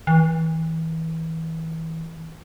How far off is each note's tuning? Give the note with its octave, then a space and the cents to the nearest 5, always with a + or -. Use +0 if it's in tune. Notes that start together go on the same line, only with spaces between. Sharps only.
E3 -30